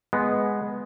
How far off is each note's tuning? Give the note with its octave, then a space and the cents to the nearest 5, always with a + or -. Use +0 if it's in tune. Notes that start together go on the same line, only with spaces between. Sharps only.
G#3 +0 B3 +0